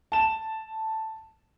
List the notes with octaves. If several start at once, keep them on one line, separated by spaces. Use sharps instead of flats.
A5 E7